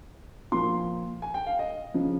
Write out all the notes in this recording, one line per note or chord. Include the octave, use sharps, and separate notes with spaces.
A#2 F3 C6
G#5
G5
F5
D#5
C#3 F3